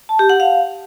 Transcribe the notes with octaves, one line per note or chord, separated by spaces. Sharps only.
A5
G4
F#5
F5